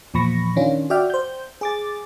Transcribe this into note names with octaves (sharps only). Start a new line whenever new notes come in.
E2 A#2 F3 B5 C#6 A#6
D#3 C#4 D4 F4
F#4 D5 E5 G5 F6
C5 G6
G#4 D6 A6